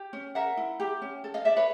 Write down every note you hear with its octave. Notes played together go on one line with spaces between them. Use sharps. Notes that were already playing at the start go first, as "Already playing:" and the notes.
Already playing: G4
C#4
A#4 E5 F#5
E4
G4
C#4
A4
D#5 F5
A4 D5 E5
B4 C#5